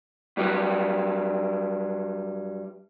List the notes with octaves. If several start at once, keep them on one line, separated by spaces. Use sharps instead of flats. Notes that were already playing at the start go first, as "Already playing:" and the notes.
G2 F#3 G3